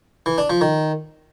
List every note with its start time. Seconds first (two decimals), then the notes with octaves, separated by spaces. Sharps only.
0.26 E3
0.38 D4
0.50 F3
0.61 D#3